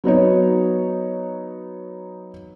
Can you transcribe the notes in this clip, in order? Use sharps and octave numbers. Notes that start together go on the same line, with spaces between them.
F#3 B3 D#4 C#5